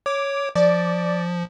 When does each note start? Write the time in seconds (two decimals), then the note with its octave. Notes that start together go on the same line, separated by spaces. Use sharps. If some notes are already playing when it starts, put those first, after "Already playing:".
0.06 C#5 D6
0.55 F3 D5